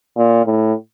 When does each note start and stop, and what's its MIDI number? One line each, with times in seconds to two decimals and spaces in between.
0.16 0.43 46
0.45 0.73 45